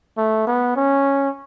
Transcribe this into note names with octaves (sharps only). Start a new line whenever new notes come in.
A3
B3
C#4